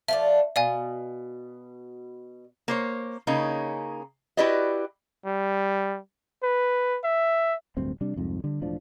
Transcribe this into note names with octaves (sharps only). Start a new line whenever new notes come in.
F3 A3 D4 E5
B2 D5 F5 G#5
A#3 C5 C#5
C#3 A#3 C#4 D#4
E4 F#4 G4 B4 D5 D#5
G3
B4
E5
D1 D2 G2 C4
C3 G3 D4
C2 F2 G#2
D3 G3
E1 A2 F3 D4